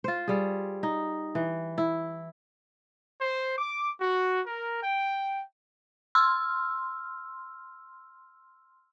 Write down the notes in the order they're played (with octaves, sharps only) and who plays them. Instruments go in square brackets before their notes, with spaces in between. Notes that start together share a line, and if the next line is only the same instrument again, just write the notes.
[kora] F4 C5
G3 G#4
D#4
E3
E4
[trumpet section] C5
D6
F#4
A#4
G5
[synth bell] C6 E6 F6